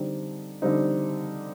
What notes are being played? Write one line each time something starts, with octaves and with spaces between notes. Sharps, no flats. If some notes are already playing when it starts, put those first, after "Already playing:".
Already playing: D3 G3 C4 D#4
D3 G3 C4 D#4